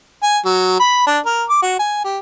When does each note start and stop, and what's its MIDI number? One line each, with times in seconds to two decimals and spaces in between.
0.23 0.39 80
0.45 0.76 54
0.80 1.03 83
1.07 1.19 62
1.26 1.44 70
1.49 1.60 86
1.62 1.79 66
1.79 2.03 80
2.04 2.19 67